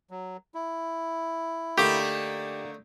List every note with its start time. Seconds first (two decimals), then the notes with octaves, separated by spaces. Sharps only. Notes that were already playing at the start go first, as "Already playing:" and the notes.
0.10 F#3
0.54 E4
1.78 D3 A3 A#3 D#4 G4 D6